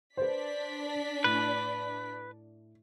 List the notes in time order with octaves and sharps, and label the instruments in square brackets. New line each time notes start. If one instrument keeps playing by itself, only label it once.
[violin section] D4 D5 B6 [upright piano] B4 C5
[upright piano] A2 [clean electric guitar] B4